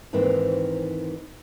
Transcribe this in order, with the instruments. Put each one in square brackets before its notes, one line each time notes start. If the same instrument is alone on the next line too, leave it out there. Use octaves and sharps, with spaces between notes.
[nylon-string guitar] G#2 D#3 E3 A#3 C4